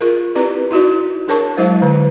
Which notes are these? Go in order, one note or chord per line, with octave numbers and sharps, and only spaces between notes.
F4 G#4 A#4
C4 E4 G4 B4 D5
D#4 E4 F#4 D5
D4 G#4 A#4 C#5 A5 C#6
F#3 G#3 E4 C5 F5
D3